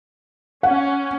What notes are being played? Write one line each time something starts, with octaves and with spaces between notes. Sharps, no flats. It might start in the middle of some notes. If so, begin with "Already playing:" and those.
C#4 F#5